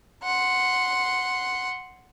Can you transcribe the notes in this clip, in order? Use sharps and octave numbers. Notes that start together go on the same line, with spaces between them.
F#5 C6